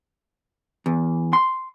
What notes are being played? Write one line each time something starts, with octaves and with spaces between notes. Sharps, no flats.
E2
C6